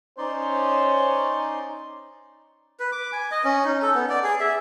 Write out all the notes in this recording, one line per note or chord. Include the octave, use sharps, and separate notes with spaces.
C#4 D#4 C5 D5 C6
B4
D6
G#5
D#5
C#4
D#4
A4
B3
D5
G#4
E5